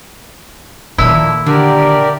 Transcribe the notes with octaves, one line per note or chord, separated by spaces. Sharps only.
A#2 D3 D#3 F3 A#3 E4
D3 G4 A#4 D5